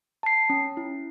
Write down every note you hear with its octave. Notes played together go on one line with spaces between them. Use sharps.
A5 C7
C#4
E4